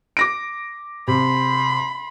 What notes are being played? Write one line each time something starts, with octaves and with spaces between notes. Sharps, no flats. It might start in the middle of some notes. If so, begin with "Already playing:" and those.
D6 A#6 D7
C3 B5 C6